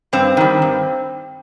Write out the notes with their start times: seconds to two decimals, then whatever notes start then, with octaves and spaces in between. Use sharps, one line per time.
0.13 G2 C4
0.37 D#3 G3
0.62 G2